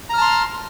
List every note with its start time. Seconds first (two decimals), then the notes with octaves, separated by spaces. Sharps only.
0.10 A#5
0.14 F6
0.18 A5
0.22 C6